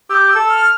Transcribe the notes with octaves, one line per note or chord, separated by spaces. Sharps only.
G4 D6 E6
E6
A4
F6